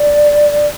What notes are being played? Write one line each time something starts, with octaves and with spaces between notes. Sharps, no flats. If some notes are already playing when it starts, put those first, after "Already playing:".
Already playing: D5